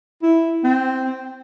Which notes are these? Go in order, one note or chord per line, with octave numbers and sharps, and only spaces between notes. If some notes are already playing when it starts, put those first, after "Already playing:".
E4
C4